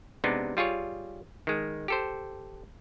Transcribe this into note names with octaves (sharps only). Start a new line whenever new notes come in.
C3 G#3 B3 D4 D#4
G3 F4 G#4 C#5
D#3 G#3
G4 A4 C5